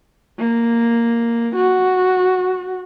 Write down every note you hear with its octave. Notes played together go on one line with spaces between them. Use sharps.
A#3
F#4